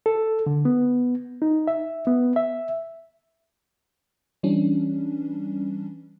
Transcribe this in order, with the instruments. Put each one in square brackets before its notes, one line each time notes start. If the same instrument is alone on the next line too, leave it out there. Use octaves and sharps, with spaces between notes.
[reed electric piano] A4
D3
B3
D#4
E5
B3
E5
[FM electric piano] E3 G3 C#4 D4